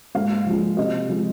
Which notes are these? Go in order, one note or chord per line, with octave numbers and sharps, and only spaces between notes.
G#2 F5
F3 G#3
C3 D#5
F3 G#3